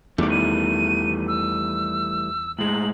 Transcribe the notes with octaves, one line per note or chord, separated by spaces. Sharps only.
E2 D#3 E3 G3 A3 D6
D#7
E6
A2 G#3 F#7